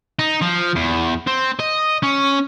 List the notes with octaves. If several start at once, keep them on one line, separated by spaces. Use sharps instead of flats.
D#4
F3
E2
C4
D#5
C#4